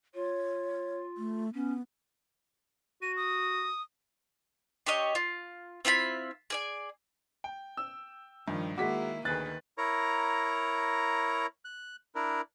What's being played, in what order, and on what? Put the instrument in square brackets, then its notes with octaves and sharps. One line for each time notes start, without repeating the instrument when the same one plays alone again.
[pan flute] F4 [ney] C#5
[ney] A3
[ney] B3 [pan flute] C#4
[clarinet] F#4 [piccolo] D#7
[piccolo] D#6
[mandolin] D4 G4 C#5 D#5
F4
C4 E4 F4 B5
G#4 D5 G#5
[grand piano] G5
[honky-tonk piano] E6
[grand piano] G2 [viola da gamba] D#3 F3
[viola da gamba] D#3 A#3 E4 [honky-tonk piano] G#3 F#4 [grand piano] D6 B6
[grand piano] D2 G#4 F#6 [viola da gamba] D#3 B4 [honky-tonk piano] A6
[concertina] E4 A#4 C#5 A#5
F#6
D4 E4 A#4